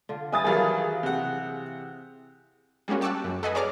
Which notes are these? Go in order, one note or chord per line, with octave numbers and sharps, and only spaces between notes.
D3 F4
G3 E4 B4 G#5 D#6 A6
D#3 E3 F#3 G3 G#4 A4 F5
C3 F#5
G3 G#3 A#3 C#4 F#4
G5 A5 C#6 D6 E6 F#6
F#2
A4 B4 D#5 F#5 G#5 B5
G#4 C#5 D5 A#5 D6 F6